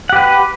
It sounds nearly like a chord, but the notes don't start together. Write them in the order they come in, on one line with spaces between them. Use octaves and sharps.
F#5 G4 B4